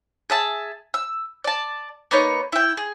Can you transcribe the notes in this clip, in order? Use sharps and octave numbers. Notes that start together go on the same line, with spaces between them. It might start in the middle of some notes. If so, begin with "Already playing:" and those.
G#4 E5 A5
E6
D5 A5
A#3 B3 D#4 C#5
E4 G5
G#4